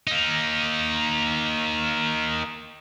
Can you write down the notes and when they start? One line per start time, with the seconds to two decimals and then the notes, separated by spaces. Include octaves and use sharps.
0.08 A#3 D#4